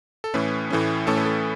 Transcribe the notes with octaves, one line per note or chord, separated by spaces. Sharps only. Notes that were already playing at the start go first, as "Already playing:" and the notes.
A4
A2 E3 A3 C#4 B4
A2 E3 A3 C#4
A2 E3 A3 C#4 A4
B4
A4